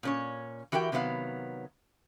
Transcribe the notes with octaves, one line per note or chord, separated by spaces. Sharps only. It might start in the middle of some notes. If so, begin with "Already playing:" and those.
A#2 C#4 C#5
E3 F#4 G4 A#4 G5
C3 D#3 F#3 B3 F5